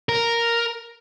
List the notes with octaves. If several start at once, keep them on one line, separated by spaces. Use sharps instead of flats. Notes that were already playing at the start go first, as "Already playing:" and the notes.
A#4